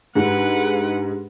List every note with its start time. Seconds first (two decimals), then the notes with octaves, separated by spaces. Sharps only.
0.15 G#2 G#3 D4 G4 G#4 B4 F#5